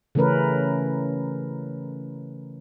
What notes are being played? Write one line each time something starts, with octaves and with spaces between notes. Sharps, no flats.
C#3 E3 A3 C#4 A#4 B4